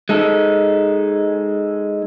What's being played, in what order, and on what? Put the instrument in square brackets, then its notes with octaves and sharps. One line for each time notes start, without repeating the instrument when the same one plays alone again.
[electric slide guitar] G#3 D#4 A4